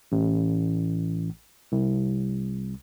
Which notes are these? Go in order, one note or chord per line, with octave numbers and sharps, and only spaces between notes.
A1
C2